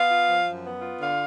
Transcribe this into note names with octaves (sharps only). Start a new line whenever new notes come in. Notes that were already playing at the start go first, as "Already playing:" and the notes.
Already playing: B3 F5
F4
F3
F#2
B3
F4
D3 F5